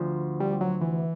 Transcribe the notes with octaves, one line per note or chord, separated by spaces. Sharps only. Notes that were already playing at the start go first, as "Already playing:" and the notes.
Already playing: D2 F3
G3
F#3
E3